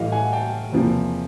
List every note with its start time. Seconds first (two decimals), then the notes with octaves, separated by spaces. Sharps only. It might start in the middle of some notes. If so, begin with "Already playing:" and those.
Already playing: A2 E3 G3 D#5 F5
0.12 F#5 G#5
0.33 G5 A5
0.72 E2 C3 F3 A#3